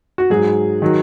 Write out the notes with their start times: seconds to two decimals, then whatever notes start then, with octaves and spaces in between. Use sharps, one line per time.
0.18 F#4
0.30 G#2 F#3 G#4
0.82 D#3 F#3